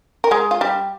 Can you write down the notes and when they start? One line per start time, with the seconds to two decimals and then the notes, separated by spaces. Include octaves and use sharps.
0.24 A#4
0.31 G#3 G#4
0.51 F4
0.61 G3 G4